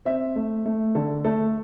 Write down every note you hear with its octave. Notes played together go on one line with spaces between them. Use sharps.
C4 E5
A3
A3
D3 A4
A3 A4